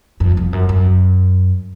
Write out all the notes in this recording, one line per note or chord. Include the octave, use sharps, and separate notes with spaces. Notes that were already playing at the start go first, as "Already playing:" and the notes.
F2
F2
F#2
F#2